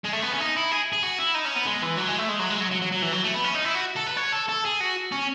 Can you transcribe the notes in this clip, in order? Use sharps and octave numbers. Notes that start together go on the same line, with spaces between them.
G#3
A3
B3
C#4
D#4
E4
G#4
G#4
F#4
E4
D#4
C#4
B3
G#3
E3
F#3
G#3
A3
G#3
F#3
G#3
F#3
F#3
F#3
F#3
E3
F#3
A3
B3
C#4
D#4
E4
F#4
A4
B4
C#5
A4
A4
G#4
F#4
C#4